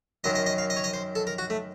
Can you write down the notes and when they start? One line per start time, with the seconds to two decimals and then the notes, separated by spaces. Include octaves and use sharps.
0.24 F#2 D#3 F#3 D#5
0.35 D#5
0.46 D#5
0.58 F5
0.70 D#5
0.77 C#5
0.84 D#5
0.93 C5
1.15 A4
1.27 A#4
1.38 F#4
1.50 A3